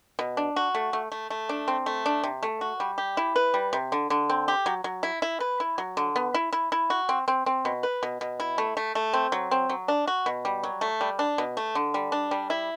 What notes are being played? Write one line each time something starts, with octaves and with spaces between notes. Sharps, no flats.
B2
D4
F#4
A3
A3
A3
A3
D4
C4
A3
D4
C3
A3
F#4
G3
G4
E4
B4
G3
C3
D3
D3
C4
G4
F#3
F#3
E4
E4
B4
E4
F#3
D3
B3
E4
E4
E4
F#4
C4
C4
C4
B2
B4
B2
B2
E4
A3
A3
A3
C4
F#3
C4
F#3
D4
F#4
B2
G3
F#3
A3
G3
D4
B2
A3
D3
G3
D4
G3
E4